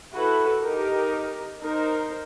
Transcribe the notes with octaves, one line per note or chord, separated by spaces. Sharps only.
E4 F#4 A4 B4
D#4 G4 A#4
D#4 A#4 C5